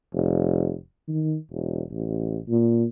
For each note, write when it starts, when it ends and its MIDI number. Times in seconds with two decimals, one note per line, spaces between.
0.13 0.75 29
1.08 1.36 51
1.51 1.82 28
1.91 2.38 33
2.49 2.84 46